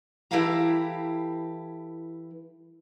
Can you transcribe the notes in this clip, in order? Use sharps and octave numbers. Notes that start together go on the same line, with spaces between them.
E3 E4 G4 A4 F5 A#5